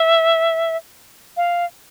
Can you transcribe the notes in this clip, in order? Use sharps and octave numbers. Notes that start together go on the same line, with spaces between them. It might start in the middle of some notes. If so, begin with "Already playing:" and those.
Already playing: E5
F5